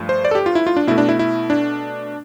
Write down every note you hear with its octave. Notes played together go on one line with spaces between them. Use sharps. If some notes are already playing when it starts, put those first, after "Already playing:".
Already playing: G2 F3 A3
C5
D5
A4
G4
F4
E4
F4
D4
B2 A3 E4
D4
E4
E4
D4